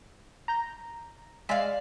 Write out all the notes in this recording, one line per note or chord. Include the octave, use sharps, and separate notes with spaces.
A#5 G6 A#6
G#3 D5 E5 F5